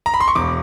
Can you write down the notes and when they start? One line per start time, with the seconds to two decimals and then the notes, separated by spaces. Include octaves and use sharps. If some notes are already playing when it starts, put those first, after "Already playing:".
0.06 A#5
0.14 B5
0.20 C6
0.28 C#6
0.35 E1 D6